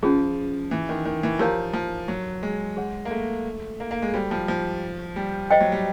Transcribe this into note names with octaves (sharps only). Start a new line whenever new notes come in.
F3 C#4 F4 G#4
E3
D#3
D#3
E3
F3 G4 A#4 C#5 F5 A#5
F3
F#3
G#3
G#4 C#5 F#5
A#3
A3
A#3
A#3
G#3
G3 F#4 A4 C5
F3
F3
G3
C5 D#5 G5
F#3
G3